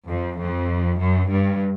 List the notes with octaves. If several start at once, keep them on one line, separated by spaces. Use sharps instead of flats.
F2
F2
F#2
G2